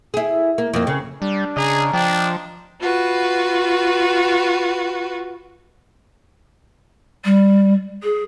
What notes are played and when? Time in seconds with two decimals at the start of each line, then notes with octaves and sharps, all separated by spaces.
0.14 E4 G#4
0.58 A#3
0.74 F2 A#3
0.87 C#3
1.22 G3 D4
1.57 C#3 G#4 D#5 A#5
1.93 F3 D4 G5
2.81 F4 F#4 B4
7.24 G3
8.03 G#4